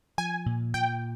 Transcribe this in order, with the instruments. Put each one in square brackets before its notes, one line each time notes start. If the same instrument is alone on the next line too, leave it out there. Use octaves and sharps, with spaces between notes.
[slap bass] F3 [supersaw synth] G#5
[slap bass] A#2
[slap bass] A#2 [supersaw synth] G5